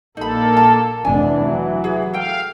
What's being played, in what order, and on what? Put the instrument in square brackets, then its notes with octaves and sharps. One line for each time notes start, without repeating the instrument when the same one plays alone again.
[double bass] A#1 [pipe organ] A#3 A4 [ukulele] D#4 B5
[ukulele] A5
[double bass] F1 D4 [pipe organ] E3 [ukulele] G#5
[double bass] F#3
[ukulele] G#4
[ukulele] A4 G5 [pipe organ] F5